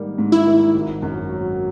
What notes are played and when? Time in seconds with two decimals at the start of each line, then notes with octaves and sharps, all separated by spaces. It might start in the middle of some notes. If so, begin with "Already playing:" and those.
Already playing: G#2 D#3 G3 A#3
0.18 G#2
0.32 E4
0.46 D#3
0.75 G#1
1.03 F#2
1.31 F#3